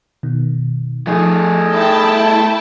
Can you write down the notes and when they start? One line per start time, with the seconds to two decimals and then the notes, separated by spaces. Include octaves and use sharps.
0.23 B2 D#3
1.07 F3 A3 D#4 G#4
1.73 E4 G5 A5